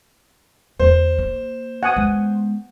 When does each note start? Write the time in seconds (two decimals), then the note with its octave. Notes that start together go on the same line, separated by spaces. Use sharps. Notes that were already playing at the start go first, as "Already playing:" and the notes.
0.79 E2 D3 C5
1.18 A#3
1.83 F#5 G#5 D#6
1.96 G#3 B3